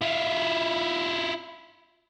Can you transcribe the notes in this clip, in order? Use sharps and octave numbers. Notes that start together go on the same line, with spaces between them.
E4 F4